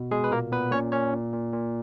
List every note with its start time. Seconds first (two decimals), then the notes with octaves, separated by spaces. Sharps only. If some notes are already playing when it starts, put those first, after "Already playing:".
Already playing: B2
0.11 B2 G#3 G#4
0.24 B4
0.31 A#2 A#3 A#4
0.52 A#2 B3 B4
0.72 A#2 C#4 C#5
0.92 A#2 C#4 C#5
1.13 A#2
1.33 A#2
1.53 A#2